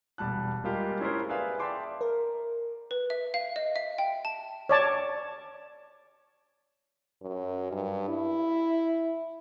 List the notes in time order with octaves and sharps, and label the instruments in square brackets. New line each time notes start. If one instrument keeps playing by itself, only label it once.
[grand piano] E1 G3 A5 F#6
G3 G#3 A#3 F4 G4
C#4 E4 F4 G#4 A#4 C5
G#4 B4 D5 E5 F5 G#5
D5 E5 G5 A5 C6 D6
[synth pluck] A#4
[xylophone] B4
E5
F5
D#5
E5
G5
A5
[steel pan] C#5 D5 A5
[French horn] F#2
G2
E4